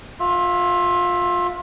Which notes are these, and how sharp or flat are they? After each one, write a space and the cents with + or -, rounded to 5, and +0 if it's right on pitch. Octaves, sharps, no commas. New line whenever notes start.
F4 +25 E5 +0